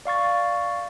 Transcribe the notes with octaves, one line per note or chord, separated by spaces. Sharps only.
D5 F5 C#6 A6